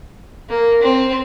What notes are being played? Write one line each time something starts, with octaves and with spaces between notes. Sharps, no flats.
A#3
C4